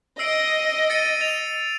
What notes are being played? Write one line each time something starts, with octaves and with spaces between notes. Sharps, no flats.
D#5 E6 C7 D7
A6 C#7 D#7
A6 F7